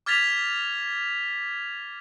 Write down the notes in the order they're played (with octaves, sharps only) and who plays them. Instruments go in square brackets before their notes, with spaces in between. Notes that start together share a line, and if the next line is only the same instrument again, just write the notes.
[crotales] D6 F6 G#6 A6 B6 F7